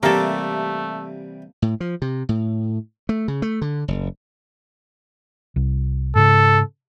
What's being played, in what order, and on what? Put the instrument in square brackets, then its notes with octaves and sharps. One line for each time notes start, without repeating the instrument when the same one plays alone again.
[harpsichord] C3 E3 G3 [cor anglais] A3 [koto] A#3 A4
[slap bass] A2
F3
C3
A2
A3
C#3
A3
D3
F#1
[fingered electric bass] C2
[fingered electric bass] G#2 C#3 [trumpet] A4